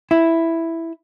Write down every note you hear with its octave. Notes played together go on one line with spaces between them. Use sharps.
E4